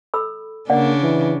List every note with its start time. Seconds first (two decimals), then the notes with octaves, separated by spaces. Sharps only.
0.14 A4 B5 E6
0.70 C#3 A#3 D4 D5 F#5
1.02 E3